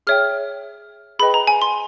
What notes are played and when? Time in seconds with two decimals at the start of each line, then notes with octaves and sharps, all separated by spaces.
0.07 G#4 C#5 E5 G5 F6
1.19 G#4 B4 D#5 G5 B5
1.34 A#5
1.47 G#5
1.62 C6